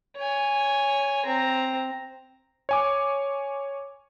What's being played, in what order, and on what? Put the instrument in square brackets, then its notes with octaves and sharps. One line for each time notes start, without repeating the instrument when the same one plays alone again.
[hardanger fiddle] C#5 G#5
C4 A#5
[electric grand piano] C#5 G#5 D6